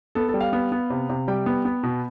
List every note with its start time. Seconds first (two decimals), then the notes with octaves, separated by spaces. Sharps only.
0.15 B3 A4
0.29 A4
0.34 G3
0.40 F5
0.53 B3
0.72 B3
0.90 C3
1.10 C3
1.28 G3 G5
1.46 B3
1.65 B3
1.83 B2